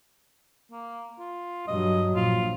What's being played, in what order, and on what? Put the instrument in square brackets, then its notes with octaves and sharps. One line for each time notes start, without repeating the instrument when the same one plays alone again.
[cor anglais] A#3
F4
[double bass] G2 F#3 [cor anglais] D#5
[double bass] A#1 [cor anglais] F4